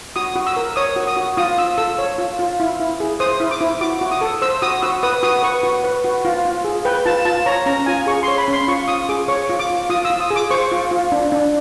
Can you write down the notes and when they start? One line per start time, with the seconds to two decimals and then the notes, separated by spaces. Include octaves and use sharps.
0.16 F#4 D#6
0.36 F#4
0.47 E6
0.56 A#4
0.76 C#5 D#6
0.96 F#4
1.07 D#6
1.17 F#4
1.37 F4 D#6
1.58 F4 E6
1.78 A4 E6
1.99 C#5
2.18 F4
2.39 F4
2.60 E4
2.80 E4
3.00 G#4
3.20 C5 D#6
3.40 E4
3.51 D6
3.61 E4
3.81 F#4 D6
4.01 F#4
4.11 D#6
4.21 A4
4.42 C5 E6
4.62 F#4 D#6
4.82 F#4 E6
5.03 B4 D#6
5.23 F#4 D#6
5.43 B4 C#6
5.63 F#4
5.84 B4
6.04 F#4
6.25 F4
6.45 F4
6.64 G#4
6.85 B4 G5
7.06 F4 A5
7.25 F4 A5
7.46 C#5 A#5
7.66 C#4 A#5
7.86 F4 G#5
8.07 G#4 C#6
8.23 C6
8.28 C#5
8.38 B5
8.48 C#4 C6
8.68 F4 C#6
8.88 F4 D#6
9.09 G#4 D6
9.28 C#5 C#6
9.49 F4
9.59 D6
9.70 F4
9.90 F4 D#6
10.05 E6
10.10 F4
10.20 D#6
10.31 G#4
10.36 D6
10.51 C5 C#6
10.72 F4
10.91 F4
11.12 D4
11.32 D4